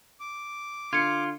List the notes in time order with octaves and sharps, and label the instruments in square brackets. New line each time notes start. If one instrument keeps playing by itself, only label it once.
[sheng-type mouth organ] D6
[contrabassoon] D3 [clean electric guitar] F4 [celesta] G#6 C#7